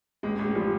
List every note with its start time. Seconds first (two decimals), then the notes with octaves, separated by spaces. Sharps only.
0.23 A1 G#3
0.39 A1
0.45 G#3
0.55 F3 G3